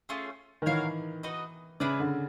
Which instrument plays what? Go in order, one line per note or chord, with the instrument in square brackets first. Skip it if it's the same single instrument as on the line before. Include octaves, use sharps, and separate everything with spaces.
[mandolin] A3 C#4 F4 G#4
[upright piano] D#3
[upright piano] E3 [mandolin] F#4 A#4 C#5 F5
[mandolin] D#4 F#4 B4 D#5
[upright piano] C#3 [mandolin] E4 G#4 B4 D5
[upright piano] D3